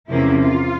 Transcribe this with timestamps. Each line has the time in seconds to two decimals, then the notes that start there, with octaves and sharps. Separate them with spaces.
0.09 E2 C3 F3 A#3 C#4 E4
0.39 F4